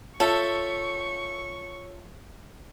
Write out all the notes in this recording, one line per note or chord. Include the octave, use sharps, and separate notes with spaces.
F4 A4 C#5 E5 C#6